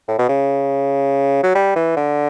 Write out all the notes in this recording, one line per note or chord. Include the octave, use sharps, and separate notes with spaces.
A2
B2
C#3
F#3
G3
E3
D3